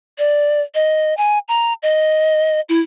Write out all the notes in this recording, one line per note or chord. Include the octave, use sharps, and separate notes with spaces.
D5
D#5
G#5
A#5
D#5
E4